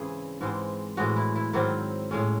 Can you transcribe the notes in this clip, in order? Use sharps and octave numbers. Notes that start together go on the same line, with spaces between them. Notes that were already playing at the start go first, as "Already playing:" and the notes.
Already playing: G#2 C#3 E3 C4 E4 G#4
G#2 E3 G#3 C4
A2 E3 G#3 F#4
E4
E4
G#2 D#3 F#3 C4 E4
A2 G#3 C#4